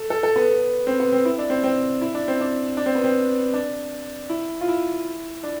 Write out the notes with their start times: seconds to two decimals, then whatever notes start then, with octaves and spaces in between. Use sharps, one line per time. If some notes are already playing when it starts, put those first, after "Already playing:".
Already playing: A4
0.10 A4
0.23 A4
0.36 B3
0.87 C4
1.00 B3
1.12 C4
1.25 E4
1.38 D4
1.50 C4
1.64 C4
2.01 E4
2.14 D4
2.28 C4
2.41 D4
2.77 D4
2.86 C4
2.95 B3
3.04 C4
3.54 D4
4.29 E4
4.61 F4
4.68 E4
5.43 D4